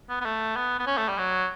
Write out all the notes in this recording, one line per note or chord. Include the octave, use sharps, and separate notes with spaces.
B3
B3
A3
B3
B3
C#4
A3
G3
F#3